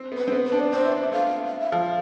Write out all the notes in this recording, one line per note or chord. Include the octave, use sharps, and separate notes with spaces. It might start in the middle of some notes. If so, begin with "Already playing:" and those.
Already playing: C4
B3
B4
C4
B3
B4
D4
D5
D4 C5
E4
D4 D5
E5
A3 F5
F5
E5
F3 F5